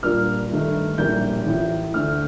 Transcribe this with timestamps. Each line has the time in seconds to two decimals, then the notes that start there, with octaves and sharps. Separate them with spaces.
0.03 A#2 G3 A#3 D4 F4 F6
0.50 G2 D#3 A3 D#4
0.98 A#1 A2 G3 A#3 G6
1.46 A1 A2 F3
1.94 D2 D3 A3 D4 F6